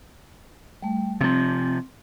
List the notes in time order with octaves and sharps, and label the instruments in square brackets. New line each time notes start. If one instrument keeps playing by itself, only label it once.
[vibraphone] G3 A3
[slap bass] C3 F3 [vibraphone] C4